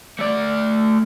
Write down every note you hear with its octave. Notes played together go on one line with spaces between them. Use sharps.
A3 D5